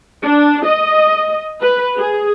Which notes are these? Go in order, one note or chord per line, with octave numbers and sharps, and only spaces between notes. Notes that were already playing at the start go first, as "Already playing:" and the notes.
D4
D#5
B4
G#4